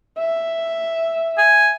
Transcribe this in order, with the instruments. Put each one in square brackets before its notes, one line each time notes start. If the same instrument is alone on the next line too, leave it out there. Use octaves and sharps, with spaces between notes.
[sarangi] E5
[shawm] G#5